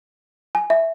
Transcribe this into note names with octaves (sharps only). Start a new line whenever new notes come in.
G#5
E5